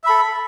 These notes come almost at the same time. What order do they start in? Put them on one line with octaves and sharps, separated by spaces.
E5 B5 A4